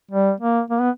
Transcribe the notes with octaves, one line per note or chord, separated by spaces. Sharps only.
G3
A#3
A#3
B3